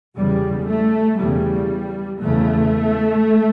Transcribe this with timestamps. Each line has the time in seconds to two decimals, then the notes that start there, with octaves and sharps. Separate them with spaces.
0.16 E2 C#3 G3
0.68 A3
1.19 E2 C#3 G3
2.22 E2 C#3 A3